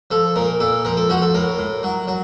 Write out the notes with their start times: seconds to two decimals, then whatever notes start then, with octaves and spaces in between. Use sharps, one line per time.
0.11 F3 A4
0.36 A#2 A#4
0.60 A#2 A4
0.85 F3 A#4
0.97 A4
1.09 F3 F#4
1.22 A4
1.34 A2 A#4
1.58 A2
1.83 F#3
2.07 F#3